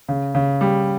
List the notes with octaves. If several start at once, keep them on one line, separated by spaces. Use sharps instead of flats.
C#3
C#3
G3